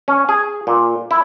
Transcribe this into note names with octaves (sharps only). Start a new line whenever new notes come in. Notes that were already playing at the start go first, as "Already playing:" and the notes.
C#4
G#4
A#2
E4